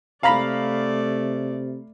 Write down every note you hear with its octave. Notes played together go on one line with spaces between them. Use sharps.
C3 A3 D5 F5 A#5 B5